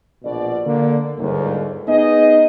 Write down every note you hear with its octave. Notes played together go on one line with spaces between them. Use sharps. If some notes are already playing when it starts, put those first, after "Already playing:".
A#1 B2 D5
D3 A#3
G1 D#2 G#2
B3 D#4 G#4 D#5